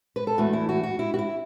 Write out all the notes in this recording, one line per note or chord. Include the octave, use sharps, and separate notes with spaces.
B4
A4
E2 E3 A3 F#4
E4
F#4
F#4
E4
F#4
E4